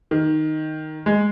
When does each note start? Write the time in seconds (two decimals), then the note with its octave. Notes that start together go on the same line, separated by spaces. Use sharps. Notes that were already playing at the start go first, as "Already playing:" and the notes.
0.11 D#3
1.06 G#3